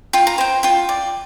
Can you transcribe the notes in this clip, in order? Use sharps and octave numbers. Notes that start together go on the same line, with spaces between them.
F4 G5
A#5
C5 G5
F4 G5
D5